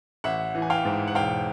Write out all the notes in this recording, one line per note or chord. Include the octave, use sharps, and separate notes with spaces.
A1 E5 F#5
E3
G#5
F5 G5
G#2
F#5
E1 F5 G5